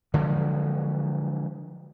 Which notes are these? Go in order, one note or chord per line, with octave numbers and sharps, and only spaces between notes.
D3 F3 F#3 G#3